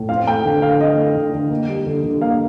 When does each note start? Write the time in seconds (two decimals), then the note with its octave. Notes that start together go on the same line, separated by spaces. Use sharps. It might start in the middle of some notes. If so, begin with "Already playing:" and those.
Already playing: A2
0.09 C4 F5
0.27 A3 G5
0.45 D3
0.62 D3 F5
0.80 C4 D#5
0.98 A3
1.15 D3
1.33 D3
1.51 A#3
1.69 G3
1.86 D3
2.04 D3
2.21 A#3 F5